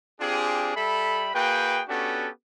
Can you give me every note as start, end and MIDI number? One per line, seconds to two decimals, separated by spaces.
0.20 0.75 60
0.20 0.75 62
0.20 0.75 65
0.20 0.75 67
0.20 0.75 68
0.76 1.30 55
0.76 1.30 69
0.76 1.30 76
0.76 1.30 83
1.34 1.82 58
1.34 1.82 66
1.34 1.82 68
1.34 1.82 71
1.34 1.82 79
1.88 2.29 59
1.88 2.29 61
1.88 2.29 62
1.88 2.29 66
1.88 2.29 67
1.88 2.29 69